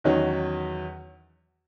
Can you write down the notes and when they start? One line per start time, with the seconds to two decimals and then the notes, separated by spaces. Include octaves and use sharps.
0.04 E2 D#3 F#3 C#4